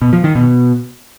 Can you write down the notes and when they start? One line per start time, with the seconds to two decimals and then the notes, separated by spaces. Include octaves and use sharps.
0.02 B2
0.13 F3
0.24 D#3
0.35 B2